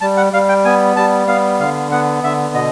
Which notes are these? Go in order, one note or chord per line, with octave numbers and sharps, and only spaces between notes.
G3 A5
F#5
G3 F5
G5
B3 G#5
G3 A5
B3 F5
D3 F5
B3 F#5
D3 E5
B2 D#5